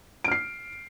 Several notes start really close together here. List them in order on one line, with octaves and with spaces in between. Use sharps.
D7 F6 C7